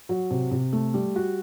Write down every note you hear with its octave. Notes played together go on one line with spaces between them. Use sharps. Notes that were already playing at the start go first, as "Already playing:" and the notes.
F#3
C3
C3
A3
G3
F#4